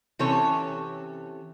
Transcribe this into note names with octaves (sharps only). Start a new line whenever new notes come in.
C3 E3 C#4 A4 C#5